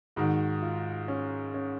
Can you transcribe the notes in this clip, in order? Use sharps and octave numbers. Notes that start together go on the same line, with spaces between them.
G#2 D#3 F#4
F4
C#4
C#4